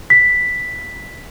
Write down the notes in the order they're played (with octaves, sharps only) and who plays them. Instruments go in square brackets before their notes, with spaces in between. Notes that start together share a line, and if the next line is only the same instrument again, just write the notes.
[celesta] B6